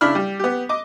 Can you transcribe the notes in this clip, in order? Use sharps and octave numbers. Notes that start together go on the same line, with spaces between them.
C#3 D4 E4 B5 F6
G3
B3 G4
D#5 D6